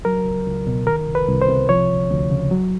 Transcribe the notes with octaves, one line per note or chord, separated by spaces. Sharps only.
F#3 A#4
C#2
C#2
B2
D#3 A#4
C2
B4
C2
C5
C3
F3 C#5
D2
D2
C#3
F#3